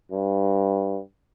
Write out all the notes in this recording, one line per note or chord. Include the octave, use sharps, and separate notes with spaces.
G2